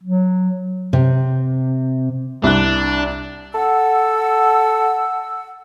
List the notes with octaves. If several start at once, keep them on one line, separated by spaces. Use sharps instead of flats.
F#3
C3
C2 D4 F#6
A4 F#5 E6